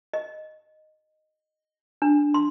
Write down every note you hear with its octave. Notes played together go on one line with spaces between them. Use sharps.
D#5
D4
C6